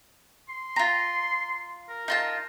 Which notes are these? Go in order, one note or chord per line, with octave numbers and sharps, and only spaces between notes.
C6
F4 A#5
A#4
D#4 F4 A5